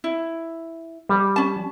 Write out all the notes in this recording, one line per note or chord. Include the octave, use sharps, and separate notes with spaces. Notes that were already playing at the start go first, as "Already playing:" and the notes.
E4
G3
C#4 A5